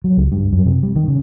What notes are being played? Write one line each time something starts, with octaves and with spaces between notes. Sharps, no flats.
F#3
C#2
G2
F#2
C3
G3
D#3
C#3